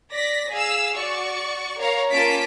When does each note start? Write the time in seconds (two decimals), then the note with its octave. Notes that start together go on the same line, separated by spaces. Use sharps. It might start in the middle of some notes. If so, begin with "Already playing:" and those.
0.13 D5 A#6 B6
0.51 G#4 F5 E6
0.95 F#4 D5 C#6
1.77 A#4 C#5 F5 A#5
2.11 A#3 C#4 F4 A5 B6 D7